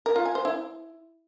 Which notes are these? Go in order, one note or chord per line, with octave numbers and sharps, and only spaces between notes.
A#4
F4
G#5
C5
E4